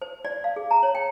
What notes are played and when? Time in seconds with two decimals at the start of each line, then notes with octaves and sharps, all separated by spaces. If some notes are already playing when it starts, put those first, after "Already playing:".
0.02 C5
0.25 D5
0.44 F5
0.56 G#4
0.71 A#5
0.83 C#5
0.95 G5